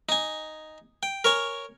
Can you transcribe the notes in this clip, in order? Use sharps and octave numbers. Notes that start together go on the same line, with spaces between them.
D#4 G#5
G5
A#4 C#5 G#5